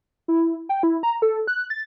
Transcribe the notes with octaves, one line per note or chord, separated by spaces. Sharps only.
E4
G5
E4
A#5
A4
F#6
A6